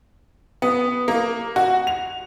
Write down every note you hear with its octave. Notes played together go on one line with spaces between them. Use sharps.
B3
A#3
F#4
F7